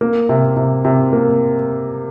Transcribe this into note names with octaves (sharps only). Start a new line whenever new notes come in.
A#3
C3
C3
C3
A#3